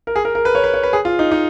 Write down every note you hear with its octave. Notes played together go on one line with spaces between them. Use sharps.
A#4
G#4
A#4
A#4
B4
C#5
B4
C#5
B4
G#4
F4
D#4
D#4